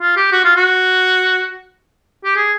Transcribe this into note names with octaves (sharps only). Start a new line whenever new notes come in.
F4
G4
F#4
F4
F#4
G4
G#4